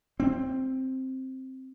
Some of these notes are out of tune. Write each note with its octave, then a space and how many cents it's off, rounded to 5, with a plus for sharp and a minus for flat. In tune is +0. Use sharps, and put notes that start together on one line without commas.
C4 +5